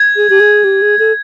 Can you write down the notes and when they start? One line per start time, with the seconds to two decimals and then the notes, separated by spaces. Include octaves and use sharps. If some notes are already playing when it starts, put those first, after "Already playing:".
Already playing: G#6
0.16 G#4
0.30 G4
0.40 G#4
0.64 G4
0.82 G#4
0.99 A4